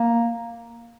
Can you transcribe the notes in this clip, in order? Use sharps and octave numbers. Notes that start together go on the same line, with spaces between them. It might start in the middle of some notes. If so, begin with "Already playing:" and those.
Already playing: A#3